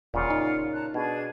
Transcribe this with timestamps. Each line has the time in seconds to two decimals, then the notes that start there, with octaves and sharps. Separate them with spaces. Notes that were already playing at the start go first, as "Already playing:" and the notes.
0.14 E1 A#2 C#3 F4 F#5
0.30 D#4
0.74 A5 A#5 F#6
0.94 B2 D4 G#4 G#6